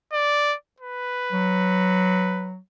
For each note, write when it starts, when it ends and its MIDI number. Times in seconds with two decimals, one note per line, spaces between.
0.13 0.55 74
0.80 2.51 71
1.32 2.57 54